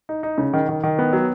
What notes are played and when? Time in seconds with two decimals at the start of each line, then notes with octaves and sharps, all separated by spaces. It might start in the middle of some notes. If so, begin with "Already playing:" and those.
0.09 D#4
0.23 D#4
0.38 C#3
0.54 D#3
0.69 D#3
0.84 D#3
0.99 B3
1.13 F#3